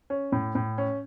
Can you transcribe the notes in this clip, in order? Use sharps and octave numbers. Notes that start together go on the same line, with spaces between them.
C#4
A2
A2
C#4